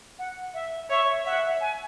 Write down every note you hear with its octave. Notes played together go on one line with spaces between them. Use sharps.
F#5
E5
C#5 E5
E5 F#5
G#5